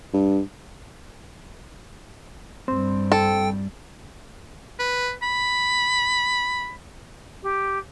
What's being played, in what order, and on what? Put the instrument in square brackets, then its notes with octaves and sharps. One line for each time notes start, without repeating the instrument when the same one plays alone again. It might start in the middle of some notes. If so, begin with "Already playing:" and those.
[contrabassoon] G2
[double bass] G2 G3 [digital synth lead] C4
[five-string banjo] A4 [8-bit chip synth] G5
[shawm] B4
B5
[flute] G4